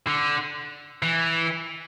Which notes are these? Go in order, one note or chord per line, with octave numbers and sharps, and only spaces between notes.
D3
E3